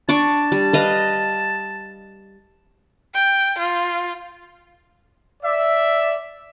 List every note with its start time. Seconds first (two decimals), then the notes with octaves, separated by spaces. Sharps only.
0.09 D4 A5 C#6 D6
0.52 G3
0.73 B4 D#5 F5
3.14 G5
3.58 F4
5.43 D5 E5